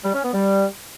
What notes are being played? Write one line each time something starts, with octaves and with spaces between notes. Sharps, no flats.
G3
C#4
B3
G3